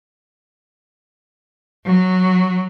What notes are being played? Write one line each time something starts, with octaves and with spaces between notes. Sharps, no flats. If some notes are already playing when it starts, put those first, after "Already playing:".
F#3